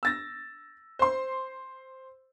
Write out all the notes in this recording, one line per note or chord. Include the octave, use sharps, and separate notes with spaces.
E6 A6 A#6
C5 C6